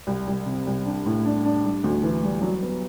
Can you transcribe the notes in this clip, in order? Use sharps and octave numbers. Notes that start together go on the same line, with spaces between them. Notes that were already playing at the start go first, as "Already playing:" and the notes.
C2
C2
C3
C2
D4
A2
D4
D4
G3
D2
E3
G3
F#3
B3